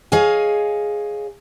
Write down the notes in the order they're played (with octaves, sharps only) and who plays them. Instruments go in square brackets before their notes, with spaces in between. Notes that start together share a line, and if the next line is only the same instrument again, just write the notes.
[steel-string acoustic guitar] G#4 C#5 D#5 F5 G#5